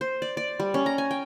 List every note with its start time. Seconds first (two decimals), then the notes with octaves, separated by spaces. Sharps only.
0.01 C5
0.22 D5
0.37 D5
0.60 G3
0.74 C#4
0.86 A#5
0.98 G#5
1.11 G5